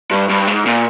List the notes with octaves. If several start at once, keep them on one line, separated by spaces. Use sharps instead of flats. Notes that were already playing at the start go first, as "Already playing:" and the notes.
G2
G2
G#2
A#2